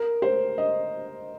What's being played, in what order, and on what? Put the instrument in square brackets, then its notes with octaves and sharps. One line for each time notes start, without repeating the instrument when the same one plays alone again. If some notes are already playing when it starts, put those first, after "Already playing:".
Already playing: [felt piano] A#4
C5
D#5